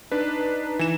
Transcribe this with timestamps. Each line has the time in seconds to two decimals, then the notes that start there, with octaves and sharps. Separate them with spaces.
0.11 D4 D#4 B4
0.79 E3 E7